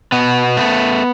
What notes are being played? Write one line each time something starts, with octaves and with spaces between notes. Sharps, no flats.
B2 B3
A3